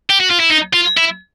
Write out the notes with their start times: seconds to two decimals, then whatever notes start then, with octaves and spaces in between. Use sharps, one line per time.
0.10 G4
0.20 F#4
0.30 F4
0.40 E4
0.50 D#4
0.73 F4
0.97 E4